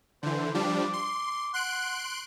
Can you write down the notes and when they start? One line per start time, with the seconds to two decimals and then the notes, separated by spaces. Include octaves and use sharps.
0.23 D3 E3 C5
0.54 F3 G3 D4 D6
0.93 C6
1.54 F#5 C6 F#6 D7